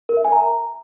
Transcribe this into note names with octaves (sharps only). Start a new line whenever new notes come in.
A#4
E5
G#5
A#5